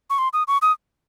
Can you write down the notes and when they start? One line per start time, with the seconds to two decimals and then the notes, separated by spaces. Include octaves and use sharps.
0.10 C#6
0.18 C6
0.33 D#6
0.48 C#6
0.62 D#6